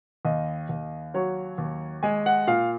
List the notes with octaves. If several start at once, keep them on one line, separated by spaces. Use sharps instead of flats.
D#2 D#5
D#2
F#3 C#5
D#2
G#3 G#5
F#5
A#2 F5